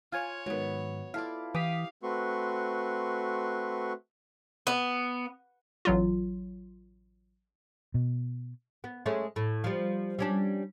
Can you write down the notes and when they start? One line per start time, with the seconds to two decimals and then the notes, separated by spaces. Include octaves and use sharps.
0.12 F4 C#5 F5 G#5
0.46 G#2 D#3 F#3 B3
1.14 E4 F4 A4 D5 F5
1.55 E3 G4 F5 D6 D#6 B6
2.03 A3 C4 F#4 B4 C6 C#6
4.67 B3
5.85 A1 F#3 F4
7.94 B2
8.84 B3
9.06 G#3 A3 C#4
9.36 A2
9.64 F3 G3
10.19 G3 C#4 D4